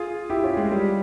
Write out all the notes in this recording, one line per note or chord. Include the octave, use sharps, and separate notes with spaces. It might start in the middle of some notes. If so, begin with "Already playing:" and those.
Already playing: F4 G#4
E4 G4
C#4 F4
G#3
G3